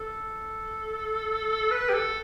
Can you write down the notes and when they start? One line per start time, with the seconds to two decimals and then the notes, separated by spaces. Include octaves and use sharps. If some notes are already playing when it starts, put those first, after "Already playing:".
Already playing: A4
1.71 B4
1.89 G4
1.94 A4